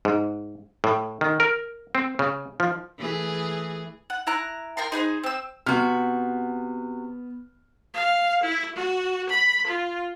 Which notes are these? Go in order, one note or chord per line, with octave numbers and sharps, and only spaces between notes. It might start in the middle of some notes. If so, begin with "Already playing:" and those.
G#2
A2
D#3
A#4
C4
C#3
F3
E3 A3 G#4
F#5
E4 A#5 F#6
A#4 G5 A#5 C6
D#4 G#4 B4 C5
C4 E6
C3 B3 F#4 F6
F5
E4
F#4
B5
F4